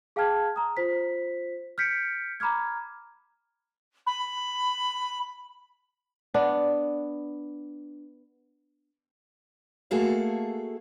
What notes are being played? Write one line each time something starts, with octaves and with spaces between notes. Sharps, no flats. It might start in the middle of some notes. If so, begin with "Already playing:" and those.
G#4 F5 G5 A5 F6 G#6
A#5 D#6
F4 C5 B6
F6 G6 B6 C#7 D7
A#5 B5 D6 F6 G#6
B5
B3 D4
A3 A#3 F#4 G#4 A4 F5